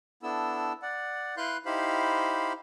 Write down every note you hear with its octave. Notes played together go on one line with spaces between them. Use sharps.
B3 D4 E4 A4 E6
D5 F#5
E4 B4 F5 C6 F#6 G6
D#4 E4 G4 C5 F5 B5